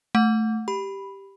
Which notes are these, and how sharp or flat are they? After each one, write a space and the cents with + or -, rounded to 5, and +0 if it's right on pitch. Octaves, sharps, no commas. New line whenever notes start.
A3 +0 F#5 -20
G4 +0 B5 +0